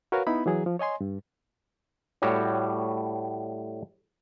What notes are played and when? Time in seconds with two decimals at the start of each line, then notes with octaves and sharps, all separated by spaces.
0.12 F#4 A#4 B4 C#5 F5
0.27 B3 D#4 E4 B5
0.46 E3 F#3 G#4
0.66 F3
0.79 C#5 D#5 G#5 C6
1.01 G2
2.22 A2 G3 F#4 G4 C#5